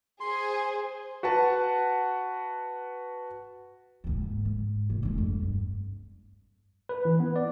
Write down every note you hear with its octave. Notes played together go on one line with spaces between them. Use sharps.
G#4 C5 C6
F#4 B4 F#5 A5
D#2 G#2
G#2
D#2 C3
G#3 D4
F2 G3
G2
B4
E3
B3
D5